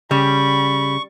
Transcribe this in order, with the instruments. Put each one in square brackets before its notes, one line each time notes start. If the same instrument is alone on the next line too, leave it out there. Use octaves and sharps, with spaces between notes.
[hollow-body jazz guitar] C#3 [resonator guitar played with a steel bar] G3 [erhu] B5 [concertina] C#6